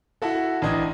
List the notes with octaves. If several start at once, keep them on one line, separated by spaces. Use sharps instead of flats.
E4 F#4 A4
A1 E3 D4 D#5 G#6